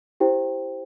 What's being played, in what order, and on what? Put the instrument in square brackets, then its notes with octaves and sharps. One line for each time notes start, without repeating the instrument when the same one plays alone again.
[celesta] E4 G4 C5 G5